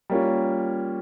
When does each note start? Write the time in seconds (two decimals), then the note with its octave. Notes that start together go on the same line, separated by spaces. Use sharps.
0.10 G3 A#3 C#4 F4